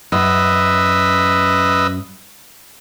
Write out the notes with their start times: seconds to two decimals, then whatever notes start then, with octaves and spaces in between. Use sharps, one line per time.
0.12 F#2 B4 D#5 E5